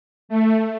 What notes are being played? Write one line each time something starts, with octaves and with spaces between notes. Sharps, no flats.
A3